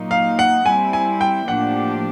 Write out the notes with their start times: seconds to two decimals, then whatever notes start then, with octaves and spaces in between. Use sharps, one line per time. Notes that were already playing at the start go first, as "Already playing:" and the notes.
Already playing: A#2 F#3 A#3 D#4
0.11 F5
0.39 F#5
0.65 G3 C4 E4 G#5
0.93 G#5
1.21 G5
1.47 A2 F3 A#3 D4 G4 F#5